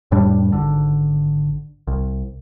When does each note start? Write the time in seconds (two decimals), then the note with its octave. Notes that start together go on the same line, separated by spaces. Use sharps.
0.11 F2 A2 G3 D4
0.52 G#1 D3
1.87 C2